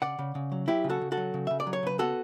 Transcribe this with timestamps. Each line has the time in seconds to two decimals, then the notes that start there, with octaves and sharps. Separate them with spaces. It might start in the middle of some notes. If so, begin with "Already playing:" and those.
0.02 C#3 D5 F#5
0.19 C#3
0.35 C#3
0.52 F#3
0.68 F#3 E4 G4
0.84 C#3
0.90 F#4 A4
1.01 C#3
1.12 F#4 A4
1.17 F#3
1.34 C#3
1.47 C#3 E5
1.60 D5
1.67 F#3
1.73 C#5
1.83 C#3 B4
1.99 B3 F#4 A4